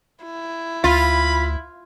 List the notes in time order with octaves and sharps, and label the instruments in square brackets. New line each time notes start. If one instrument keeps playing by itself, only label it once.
[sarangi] E4
[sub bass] D2 [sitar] F4 [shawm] B5